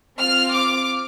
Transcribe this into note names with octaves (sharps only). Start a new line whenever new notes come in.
C4 F4 F6
D6